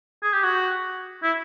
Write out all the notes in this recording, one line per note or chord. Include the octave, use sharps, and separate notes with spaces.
G#4
G4
F#4
E4